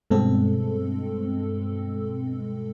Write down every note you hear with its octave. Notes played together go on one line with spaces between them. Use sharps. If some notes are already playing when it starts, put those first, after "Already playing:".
G2 B2 G#3 C4 A4